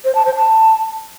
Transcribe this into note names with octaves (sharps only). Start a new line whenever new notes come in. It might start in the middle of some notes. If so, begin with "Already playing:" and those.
C5
A5
C5
A5